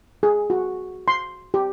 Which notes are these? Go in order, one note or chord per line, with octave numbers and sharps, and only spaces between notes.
G#4
F#4
C6
G4